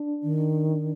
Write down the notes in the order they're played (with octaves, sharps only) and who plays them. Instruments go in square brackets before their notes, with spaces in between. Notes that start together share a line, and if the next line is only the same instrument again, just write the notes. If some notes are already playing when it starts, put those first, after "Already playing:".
Already playing: [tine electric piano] D4
[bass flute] D#3